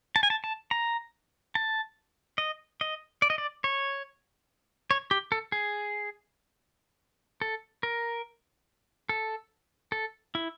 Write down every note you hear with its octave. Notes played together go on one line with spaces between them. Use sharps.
A5
G#5
A5
A5
A#5
A5
D#5
D#5
D5
D#5
D5
C#5
C#5
G4
A4
G#4
A4
A#4
A4
A4
E4